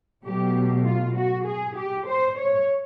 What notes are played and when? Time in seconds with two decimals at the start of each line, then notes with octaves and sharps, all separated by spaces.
0.23 B2 F#3 A3 G4
0.85 F4
1.15 F#4
1.45 G#4
1.76 G4
2.07 C5
2.38 C#5